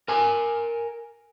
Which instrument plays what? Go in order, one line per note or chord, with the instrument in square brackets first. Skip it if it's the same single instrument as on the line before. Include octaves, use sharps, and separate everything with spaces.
[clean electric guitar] A#4 G#5